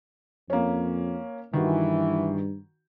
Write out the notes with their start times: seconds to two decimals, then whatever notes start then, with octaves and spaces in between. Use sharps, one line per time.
0.50 F2 A#3 C#4
1.53 G2 D#3 E3 F#4